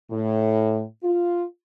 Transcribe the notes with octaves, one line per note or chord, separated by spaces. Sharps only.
A2
F4